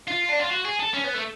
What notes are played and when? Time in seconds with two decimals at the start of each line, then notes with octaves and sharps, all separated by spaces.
0.08 F4
0.29 D4
0.40 F4
0.50 F#4
0.65 G#4
0.79 A4
0.94 C#4
1.04 B3
1.14 A3